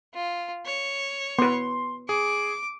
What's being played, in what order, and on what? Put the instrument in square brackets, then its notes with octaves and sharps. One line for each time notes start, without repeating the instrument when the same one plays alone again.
[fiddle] F4
C#5
[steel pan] B3 B4 [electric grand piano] C6
[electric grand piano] G#4 [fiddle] D6